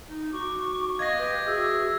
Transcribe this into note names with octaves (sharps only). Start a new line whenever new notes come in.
D#4
F#4 C#6 D6
B3 D#5 F5 G#6 A#6
G4 B4
F#4 G#4 E5